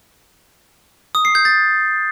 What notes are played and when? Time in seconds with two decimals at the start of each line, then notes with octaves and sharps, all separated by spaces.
1.15 D#6
1.25 C7
1.35 G6
1.45 A6